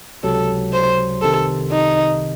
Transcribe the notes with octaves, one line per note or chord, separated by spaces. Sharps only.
C#2 C3 F#3 A4
C5
C2 C3 D#3 A4
D#4